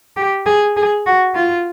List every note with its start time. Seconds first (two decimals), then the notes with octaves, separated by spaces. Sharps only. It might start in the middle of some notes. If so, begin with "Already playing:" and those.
0.17 G4
0.46 G#4
0.76 G#4
1.06 F#4
1.35 F4